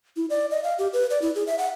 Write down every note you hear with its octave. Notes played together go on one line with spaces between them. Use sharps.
E4
D5
D#5
F5
G4
B4
D5
E4
G#4
E5
F#5